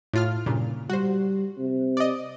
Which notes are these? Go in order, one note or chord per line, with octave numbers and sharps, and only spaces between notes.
A2 F4 F6
G2 A#2 C#3
G3 F#4 C5
C3
D5 D#5